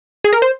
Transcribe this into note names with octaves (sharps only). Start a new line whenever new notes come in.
G#4
A#4
C5